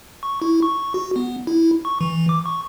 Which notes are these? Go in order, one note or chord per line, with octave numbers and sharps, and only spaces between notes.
C#6
E4
C#6
F#4
B3
E4
C#6
E3
D6
C#6